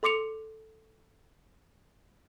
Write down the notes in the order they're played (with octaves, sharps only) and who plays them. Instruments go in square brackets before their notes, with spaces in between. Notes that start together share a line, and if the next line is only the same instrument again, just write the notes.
[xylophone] A4 C6 D6 C#7 F7